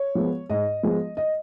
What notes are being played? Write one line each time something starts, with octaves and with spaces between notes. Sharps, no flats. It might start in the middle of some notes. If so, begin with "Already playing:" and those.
Already playing: C#5
F3 G#3 B3
G#2 D#5
F3 G#3 B3
D#5